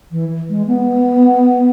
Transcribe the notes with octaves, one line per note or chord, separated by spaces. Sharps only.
E3
G#3
B3